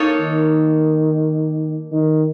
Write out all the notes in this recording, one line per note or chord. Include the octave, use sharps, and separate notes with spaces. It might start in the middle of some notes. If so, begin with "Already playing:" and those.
Already playing: A#3 D#4 A4 C#5
D#3
D#3